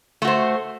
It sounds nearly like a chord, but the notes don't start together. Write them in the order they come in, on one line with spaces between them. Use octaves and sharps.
A3 F#4 C5